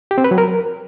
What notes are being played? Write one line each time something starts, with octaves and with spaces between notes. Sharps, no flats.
G4
C4
B4
F#3
A#4